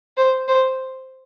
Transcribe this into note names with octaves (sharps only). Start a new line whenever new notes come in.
C5
C5